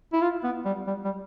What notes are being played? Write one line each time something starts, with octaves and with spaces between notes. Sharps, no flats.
E4
F4
B3
G3
G3
G3